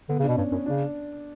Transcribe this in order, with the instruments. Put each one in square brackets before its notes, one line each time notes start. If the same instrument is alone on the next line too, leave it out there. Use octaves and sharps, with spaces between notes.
[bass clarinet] D3 [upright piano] B3
[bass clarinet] C#3
[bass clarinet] B2 [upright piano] D4
[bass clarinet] G2 [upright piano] C#4
[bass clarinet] F#2 [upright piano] C#4
[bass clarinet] C#3 [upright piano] D4